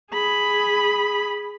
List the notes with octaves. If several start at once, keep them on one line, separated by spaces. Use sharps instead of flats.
G#4 B5